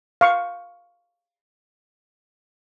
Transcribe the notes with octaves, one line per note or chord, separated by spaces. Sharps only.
F5 C#6